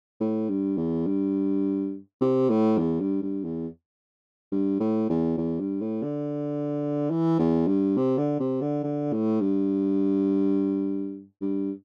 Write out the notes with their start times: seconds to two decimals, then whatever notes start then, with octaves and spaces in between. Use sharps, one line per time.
0.20 A2
0.49 G2
0.77 E2
1.07 G2
2.21 C3
2.49 A2
2.78 E2
3.01 G2
3.22 G2
3.44 E2
4.52 G2
4.80 A2
5.10 E2
5.38 E2
5.60 G2
5.81 A2
6.03 D3
7.10 E3
7.39 E2
7.67 G2
7.97 C3
8.18 D3
8.40 C3
8.62 D3
8.83 D3
9.12 A2
9.40 G2
11.41 G2